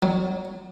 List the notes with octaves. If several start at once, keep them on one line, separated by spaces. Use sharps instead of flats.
F#3